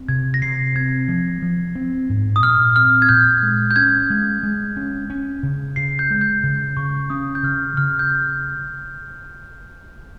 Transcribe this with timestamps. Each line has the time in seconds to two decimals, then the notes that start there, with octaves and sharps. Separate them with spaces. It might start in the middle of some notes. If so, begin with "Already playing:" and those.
Already playing: C4
0.08 C3 G#6
0.34 A#6
0.42 C3 C7
0.75 C4 G#6
1.08 F3
1.42 F3
1.76 C4
2.09 G#2
2.36 D#6
2.43 A#2 F6
2.76 C4 F6
3.02 G#6
3.09 A#2 G6
3.42 G#3
3.71 G6
3.76 C#4 G#6
4.10 G#3
4.43 G#3
4.77 C#4
5.10 C#4
5.43 C#3
5.76 C#3 C7
5.99 G6
6.11 G#3
6.21 G6
6.43 C#3
6.77 C#3 C#6
7.10 C#4 D#6
7.35 G6
7.43 C#3 F6
7.77 C#3 F6
7.99 G6